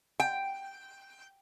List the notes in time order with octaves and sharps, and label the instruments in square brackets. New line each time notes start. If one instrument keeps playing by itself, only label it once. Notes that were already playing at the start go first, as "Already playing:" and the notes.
[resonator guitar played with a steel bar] G5